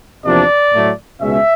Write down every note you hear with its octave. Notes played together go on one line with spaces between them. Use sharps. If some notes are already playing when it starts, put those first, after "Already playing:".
E2 C3 F3 A#3 D4 D5
A2 F#3 A3
C#2 B2 G#3 C#4 E5